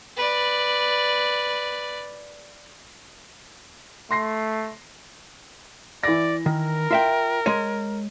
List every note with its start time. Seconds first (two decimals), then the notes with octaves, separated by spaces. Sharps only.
0.17 B4 D5
4.11 A3 C6 A#6 C7
6.03 E3 D5 A#6
6.46 D#3 A#4
6.91 F4 E5 G5
7.46 G#3 C#5 D#7